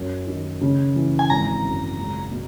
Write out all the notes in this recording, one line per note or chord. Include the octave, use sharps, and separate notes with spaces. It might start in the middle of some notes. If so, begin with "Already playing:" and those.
Already playing: F#2
D#3
C#3
E3
G#5
G#1 A#5
F#2
C#2
B2